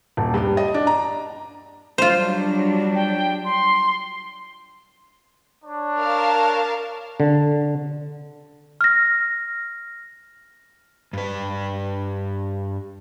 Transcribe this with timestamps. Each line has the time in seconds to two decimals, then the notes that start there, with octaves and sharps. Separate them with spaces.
0.17 D#1
0.34 G2
0.57 D#5
0.74 D4
0.87 A#5
1.98 F#3 G3 D4 F4 C5
2.95 G5
3.44 C6
5.65 D4 C#5
5.98 A#4 F5 A5
7.20 D3
8.81 F6 A#6
11.13 G2 B4